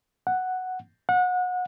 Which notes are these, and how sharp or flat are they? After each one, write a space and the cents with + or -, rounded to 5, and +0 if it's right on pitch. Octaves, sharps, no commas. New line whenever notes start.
F#5 +0
F#5 -30